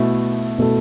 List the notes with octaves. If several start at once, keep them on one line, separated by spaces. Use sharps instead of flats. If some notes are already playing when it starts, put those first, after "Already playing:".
Already playing: B2 A3 E4 A4
B2 A3 E4 A4